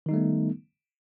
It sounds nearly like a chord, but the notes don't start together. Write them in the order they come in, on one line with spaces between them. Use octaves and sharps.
D#3 D#4 G3 A3 B3